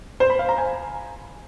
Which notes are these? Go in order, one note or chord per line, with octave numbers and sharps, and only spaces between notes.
C5
B5
F5
A#5
G#5